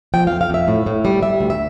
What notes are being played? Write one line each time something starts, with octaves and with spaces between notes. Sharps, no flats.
F3 G5
F2 F5
F5
F2 E5
A2
A2
G3
G3 E5
D2
E5